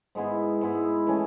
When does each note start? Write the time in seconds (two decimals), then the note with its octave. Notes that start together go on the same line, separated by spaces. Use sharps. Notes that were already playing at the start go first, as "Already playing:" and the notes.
0.15 G#2 G#3 B3 E4
0.61 G#2 G#3 B3 E4
1.07 E3 A3 C#4 G#4